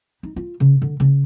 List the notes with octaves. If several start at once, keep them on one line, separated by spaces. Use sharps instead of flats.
D#4
F4
C#3
D3
C#3